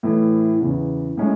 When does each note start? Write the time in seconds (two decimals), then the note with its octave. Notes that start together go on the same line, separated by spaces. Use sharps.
0.03 A2 E3 A3 E4
0.60 E2 C#3 E3
1.17 A2 G#3 C#4